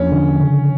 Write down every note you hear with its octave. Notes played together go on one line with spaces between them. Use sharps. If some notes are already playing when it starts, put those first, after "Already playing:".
Already playing: E2 F3 A#3 C#4 D4
D3
C#3